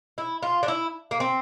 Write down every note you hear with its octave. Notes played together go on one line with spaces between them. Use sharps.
E4
F4
D4
E4
A#3
C4